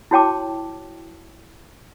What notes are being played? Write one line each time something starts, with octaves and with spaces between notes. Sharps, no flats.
E4 F#4 C#5 G5 A5 D6